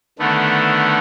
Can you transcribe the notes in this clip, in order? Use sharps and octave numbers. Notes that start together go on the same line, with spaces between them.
D3 D#3 A3 B3